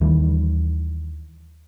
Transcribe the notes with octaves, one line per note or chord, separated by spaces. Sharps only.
D#2 D#3 E3 G3